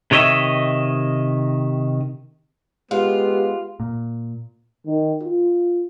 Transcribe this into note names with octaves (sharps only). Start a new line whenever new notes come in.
C3 D#3 C#5 D#5 E5
G#3 B3 F4 G4
A#2
D#3
F4